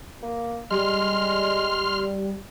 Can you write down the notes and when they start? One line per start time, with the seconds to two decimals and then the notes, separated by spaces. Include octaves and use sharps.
0.23 A#3
0.71 G3 G#3 C6 F6